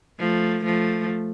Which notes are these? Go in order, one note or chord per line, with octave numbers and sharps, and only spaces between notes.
F3 A3
F3 A3